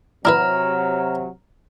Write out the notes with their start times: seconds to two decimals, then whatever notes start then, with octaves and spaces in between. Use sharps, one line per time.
0.25 C3 F#3 D4 E4 B4 A#5 F6